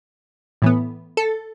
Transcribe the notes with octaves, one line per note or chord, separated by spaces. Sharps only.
A2 E3 B3
A4